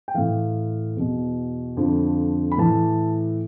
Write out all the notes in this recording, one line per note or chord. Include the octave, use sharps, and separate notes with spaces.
G5
A2 E3 F5
E2 B2
F2 D3 F3
B5
A2 E3 A5